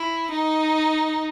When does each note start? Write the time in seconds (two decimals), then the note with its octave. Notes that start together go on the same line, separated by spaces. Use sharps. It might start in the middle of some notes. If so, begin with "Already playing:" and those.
Already playing: E4
0.32 D#4